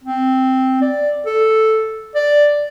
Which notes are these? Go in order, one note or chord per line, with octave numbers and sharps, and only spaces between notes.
C4
D5
A4
D5